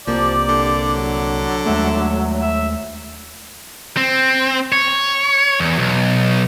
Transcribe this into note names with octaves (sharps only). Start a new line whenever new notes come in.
C2 F3 A#3 G4 D5
D3
F#3
D#2 G#3 A3 E5
E5
C4
C#5
E2
B1